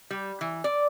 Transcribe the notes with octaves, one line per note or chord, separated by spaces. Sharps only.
G3
E3
D5